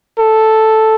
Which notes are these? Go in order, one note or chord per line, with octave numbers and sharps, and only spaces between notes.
A4